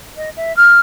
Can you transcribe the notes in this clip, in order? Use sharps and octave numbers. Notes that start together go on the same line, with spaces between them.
D#5
E5
F6